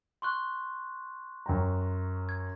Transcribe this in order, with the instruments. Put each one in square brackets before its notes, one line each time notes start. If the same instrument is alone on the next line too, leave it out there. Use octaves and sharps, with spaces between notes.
[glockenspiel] C6 C#6 F#6
[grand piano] F#2 G5 A#5
[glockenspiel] G#6